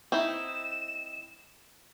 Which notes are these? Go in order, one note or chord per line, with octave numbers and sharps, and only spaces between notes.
C4 D#4 E4 E7